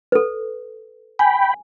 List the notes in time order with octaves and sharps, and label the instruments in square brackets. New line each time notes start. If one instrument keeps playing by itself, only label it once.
[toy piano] A4 B4
[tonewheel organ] G5 B5 [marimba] G#5